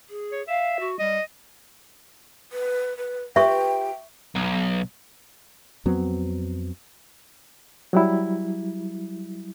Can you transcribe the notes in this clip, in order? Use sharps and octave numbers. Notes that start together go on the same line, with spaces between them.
G#4
C#5
E5 F5
F#4
G3 D#5
B4
B4
F4 G4 B4 E5 G5 C#6
B1
F2 F#3 B3 C4
F#3 G3 E4